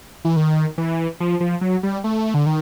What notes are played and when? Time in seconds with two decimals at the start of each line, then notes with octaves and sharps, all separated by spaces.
0.25 E3
0.36 D#3
0.78 E3
1.20 F3
1.40 F3
1.61 F#3
1.83 G3
2.04 A3
2.34 D3
2.46 D#3